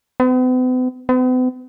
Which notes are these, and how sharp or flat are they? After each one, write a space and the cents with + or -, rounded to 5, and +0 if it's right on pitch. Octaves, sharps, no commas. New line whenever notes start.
B3 +45
B3 +45